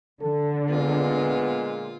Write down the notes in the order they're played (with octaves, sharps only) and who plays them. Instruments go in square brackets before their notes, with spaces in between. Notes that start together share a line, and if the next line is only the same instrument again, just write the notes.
[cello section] D3 [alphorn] A4
[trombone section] A#2 G#3 [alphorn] B3 [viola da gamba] F4